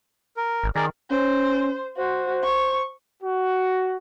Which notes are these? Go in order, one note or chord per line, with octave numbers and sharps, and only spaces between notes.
A#4
G#1
D#3 G#4 A#4 D5
C#4 C5
F#4 C5
C#6
F#4